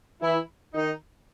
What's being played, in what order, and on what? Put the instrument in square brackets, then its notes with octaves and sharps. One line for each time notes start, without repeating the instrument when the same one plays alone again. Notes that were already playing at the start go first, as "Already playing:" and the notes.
[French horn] E3 [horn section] E4
[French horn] D#3 [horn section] D#4